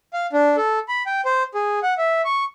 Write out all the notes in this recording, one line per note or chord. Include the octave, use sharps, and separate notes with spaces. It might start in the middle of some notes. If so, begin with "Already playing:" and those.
F5
D4
A4
B5
G5
C5
G#4
F#5
E5
C#6